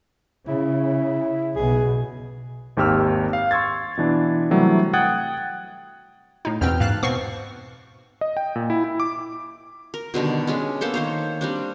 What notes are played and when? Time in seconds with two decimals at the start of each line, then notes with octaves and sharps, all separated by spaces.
0.48 C#3 E4
1.56 B1 B2 G#4
2.77 G#1 D#2 G4 E6 F6
3.33 F5
3.51 C6 C#6 E6 G#6 A6
3.97 B2 E3 D4
4.51 C3 E3 F#3 G3 A3
4.93 F#5 G5 D#6 F#6 G#6 A6
6.45 A2 D#4
6.61 E2 B2 C4 G5 F6
6.80 G#2 F5 A5 F#6
7.03 B2 C4 C#6 C7
8.21 D#5
8.37 G5
8.56 A#2
8.70 E4
8.84 E4
9.00 D6
9.94 A#4
10.14 B2 D3 D#3 G3
10.47 G#3 C#4 D4
10.81 A#3 B3 A4 C5
10.94 D#3 C5 C#5
11.41 G3 C4 D4